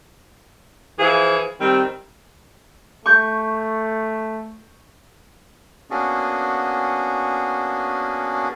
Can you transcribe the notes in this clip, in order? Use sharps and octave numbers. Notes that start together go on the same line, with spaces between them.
E3 F3 E4 G#4
D#3 G3 C4
A3 C#6 G6
A#3 B3 C#4 D4 F#4 G#4